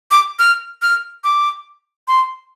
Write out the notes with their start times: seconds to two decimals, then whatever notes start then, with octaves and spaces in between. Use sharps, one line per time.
0.11 D6
0.39 F6
0.82 F6
1.24 D6
2.08 C6